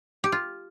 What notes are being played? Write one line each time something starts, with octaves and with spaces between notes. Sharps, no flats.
G4
F4